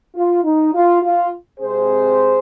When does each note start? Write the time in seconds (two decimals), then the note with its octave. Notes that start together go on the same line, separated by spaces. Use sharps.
0.15 F4
0.44 D#4
0.74 F4
1.03 F4
1.60 C3 G#3 C4 G#4 C5